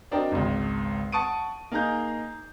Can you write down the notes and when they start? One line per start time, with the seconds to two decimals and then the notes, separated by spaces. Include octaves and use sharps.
0.11 C4 D4 F#4 A#4 D#5 G5
0.32 G#1 C#2
1.12 F#5 A5 C#6 D#6 D7 D#7
1.72 A#3 D#4 G#4 A#5 G6